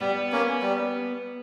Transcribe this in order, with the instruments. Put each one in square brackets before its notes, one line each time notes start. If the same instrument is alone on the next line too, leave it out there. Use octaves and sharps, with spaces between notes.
[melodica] G3 [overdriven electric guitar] B3
[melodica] A#3 C#4
G3